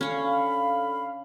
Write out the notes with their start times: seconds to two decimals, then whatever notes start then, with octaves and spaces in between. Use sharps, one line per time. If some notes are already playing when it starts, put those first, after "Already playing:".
0.01 D3 C#4 C#5 F5 B5